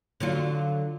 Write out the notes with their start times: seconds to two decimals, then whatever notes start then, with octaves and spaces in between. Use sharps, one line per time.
0.20 D3 F#3 F4